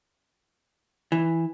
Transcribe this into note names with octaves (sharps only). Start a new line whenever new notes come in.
E3